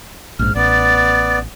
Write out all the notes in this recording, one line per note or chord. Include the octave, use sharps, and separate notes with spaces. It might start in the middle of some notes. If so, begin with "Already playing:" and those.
A#1 G#2 F6
A1 B3 D5 A6